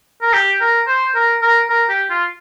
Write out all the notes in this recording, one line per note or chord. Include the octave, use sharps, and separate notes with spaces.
A#4
G4
A#4
C5
A#4
A#4
A#4
G4
F4